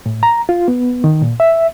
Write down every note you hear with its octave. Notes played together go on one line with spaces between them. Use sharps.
A2
A#5
F4
B3
D#3
A#2
E5